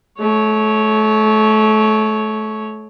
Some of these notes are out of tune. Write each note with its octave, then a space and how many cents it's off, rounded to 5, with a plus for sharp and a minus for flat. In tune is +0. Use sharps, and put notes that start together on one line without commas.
A3 -30 C#5 +0